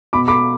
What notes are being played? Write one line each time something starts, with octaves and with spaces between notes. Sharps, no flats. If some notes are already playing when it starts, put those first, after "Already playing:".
B2 B5 D6
B5 D6